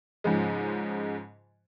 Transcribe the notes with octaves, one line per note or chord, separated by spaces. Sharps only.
G#2 C#3 F3 G#3